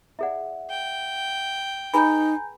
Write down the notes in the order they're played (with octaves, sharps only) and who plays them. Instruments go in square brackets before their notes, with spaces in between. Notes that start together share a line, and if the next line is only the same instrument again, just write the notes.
[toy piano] E4 G#4 D5 [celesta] E5 F#5
[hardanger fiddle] G5
[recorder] D#4 [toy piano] G#4 B4 B5 [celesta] G#5 A#5 G6